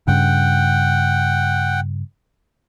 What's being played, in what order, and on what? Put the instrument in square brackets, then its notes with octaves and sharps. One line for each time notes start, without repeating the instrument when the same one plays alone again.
[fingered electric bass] G2 C#3 [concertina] F#5 G5